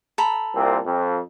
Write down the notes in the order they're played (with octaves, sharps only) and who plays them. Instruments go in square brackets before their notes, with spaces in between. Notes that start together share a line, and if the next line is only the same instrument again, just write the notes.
[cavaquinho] A4 A#5 B5
[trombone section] C2 A#2 C4
F2